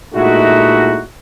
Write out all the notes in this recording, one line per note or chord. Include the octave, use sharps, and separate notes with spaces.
A#2 G#3 A3 D#4 E4 F#4